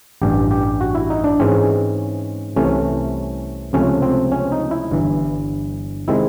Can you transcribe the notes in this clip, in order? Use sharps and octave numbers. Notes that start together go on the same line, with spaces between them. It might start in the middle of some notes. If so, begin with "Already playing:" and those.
A1 G2 E3 G4
G4
F#4
E4
D#4
D4
G#2 E3 G#3 C4 C#4
C2 C3 E3 A3 C#4
C#2 C3 F3 A3 C4 C#4
C4
C#4
D#4
E4
G1 G2 E3
C3 D#3 G#3 C4 E4